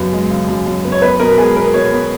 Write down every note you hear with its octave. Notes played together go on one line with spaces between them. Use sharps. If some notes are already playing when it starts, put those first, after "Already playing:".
Already playing: F#2 C#3 B3
G#3
C#3
F#2
F#2
B3
C#5
B3 B4
B2 A#4
G#3 G#4
B3 A#4
B2 C#5
B3